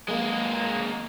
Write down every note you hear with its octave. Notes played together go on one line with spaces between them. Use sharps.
G#3 A#3